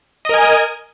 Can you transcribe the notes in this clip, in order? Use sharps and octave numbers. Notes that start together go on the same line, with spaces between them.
A#4 D#5 G#5